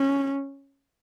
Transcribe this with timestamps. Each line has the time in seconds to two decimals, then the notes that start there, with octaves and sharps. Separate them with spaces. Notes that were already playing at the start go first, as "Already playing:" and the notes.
Already playing: C#4